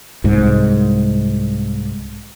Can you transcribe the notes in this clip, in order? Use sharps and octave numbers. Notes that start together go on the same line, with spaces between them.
C2 G#2